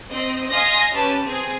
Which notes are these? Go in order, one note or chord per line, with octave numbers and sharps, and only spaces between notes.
C4 D#5
D#5 F5 G#5 C6 D#6 A#6
C#4 G4 B4 A5
C4 G#4